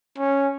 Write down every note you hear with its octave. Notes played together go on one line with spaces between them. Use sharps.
C#4